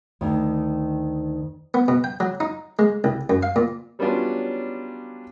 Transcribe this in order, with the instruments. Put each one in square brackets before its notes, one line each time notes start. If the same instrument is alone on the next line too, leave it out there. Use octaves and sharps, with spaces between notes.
[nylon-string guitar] D2 D#3
[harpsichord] B3
B2
G5
F#3
D#4
G#3
C2
F#2
F5
A#2
[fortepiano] F#3 G3 B3 C#4 D4 F4